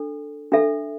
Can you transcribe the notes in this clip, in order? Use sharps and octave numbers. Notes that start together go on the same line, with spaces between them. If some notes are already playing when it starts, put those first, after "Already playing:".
Already playing: D4 A4
D4 A4 E5